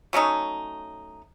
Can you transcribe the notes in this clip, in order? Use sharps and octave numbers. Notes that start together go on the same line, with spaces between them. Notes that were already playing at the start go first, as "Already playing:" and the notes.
F#3 A3 C#4 D#4